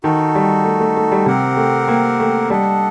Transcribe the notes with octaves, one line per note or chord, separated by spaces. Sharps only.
D#3 D#4 F#4 A4
G3
A3
A3
A3
G3
C3 C4 G4 A#4 F#5
A3
A#3
A3
G3 D4 A4 D#5 F#5